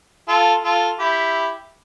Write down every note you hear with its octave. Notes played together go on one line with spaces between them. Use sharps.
F4 A4
F4 A4
E4 G4